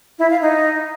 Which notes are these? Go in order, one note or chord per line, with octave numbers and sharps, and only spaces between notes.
E4
F5
D#4